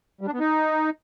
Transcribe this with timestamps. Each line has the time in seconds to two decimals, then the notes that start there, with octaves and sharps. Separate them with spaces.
0.21 G3
0.27 D4
0.34 B3
0.40 D#4